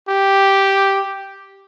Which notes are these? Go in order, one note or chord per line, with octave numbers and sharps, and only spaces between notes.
G4